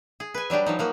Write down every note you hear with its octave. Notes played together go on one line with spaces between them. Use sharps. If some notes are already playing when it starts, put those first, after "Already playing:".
G#4
B4 G#5
F#3 G3 D4 G4
F3 F#3 D#4
F3 A#3 F#4